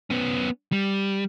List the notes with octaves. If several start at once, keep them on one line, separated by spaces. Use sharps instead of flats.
B3 C#4
G3